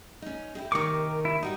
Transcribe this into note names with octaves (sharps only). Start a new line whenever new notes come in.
C#4 D#4
E4 G4 G#4
D#2 C3 D#3 A#4 C#6 D6
E4
G3 D#4 F#4 G4